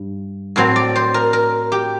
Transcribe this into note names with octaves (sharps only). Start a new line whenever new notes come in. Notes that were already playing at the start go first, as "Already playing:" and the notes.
Already playing: G2
A2 F#3 C4 C5
D5
C5
A#4
A#4
G4